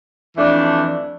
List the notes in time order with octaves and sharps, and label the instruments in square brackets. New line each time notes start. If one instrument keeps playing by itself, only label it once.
[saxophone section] F2 E3 A3 D4